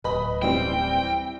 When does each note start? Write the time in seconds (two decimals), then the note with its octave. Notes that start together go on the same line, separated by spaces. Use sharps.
0.04 D1 B4 D#5 B5
0.42 E3 G3 C4 G5